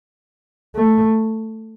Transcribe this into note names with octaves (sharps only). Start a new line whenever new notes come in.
A3